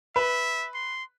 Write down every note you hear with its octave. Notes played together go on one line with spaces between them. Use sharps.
B4 E5
C6